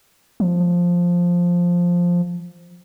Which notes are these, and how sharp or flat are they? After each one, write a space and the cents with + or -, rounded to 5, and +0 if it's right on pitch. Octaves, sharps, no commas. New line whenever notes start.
F3 +5